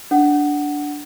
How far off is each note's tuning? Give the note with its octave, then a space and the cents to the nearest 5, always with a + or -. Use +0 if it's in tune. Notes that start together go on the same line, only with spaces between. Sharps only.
D4 -5 F#5 +10